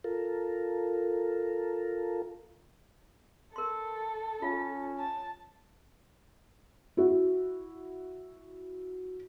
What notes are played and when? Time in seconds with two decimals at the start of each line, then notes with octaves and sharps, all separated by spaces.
0.04 F4 A4 A#4
3.56 A4 A#4 C6
4.42 C#4 F4 F5
4.98 A5
6.97 E4 F#4